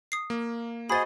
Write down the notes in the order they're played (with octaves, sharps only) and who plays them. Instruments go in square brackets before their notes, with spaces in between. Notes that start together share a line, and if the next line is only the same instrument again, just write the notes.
[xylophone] D#6 C7
[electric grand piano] A#3
[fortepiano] F#4 C5 D#5 [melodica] G#4 [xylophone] B5 A6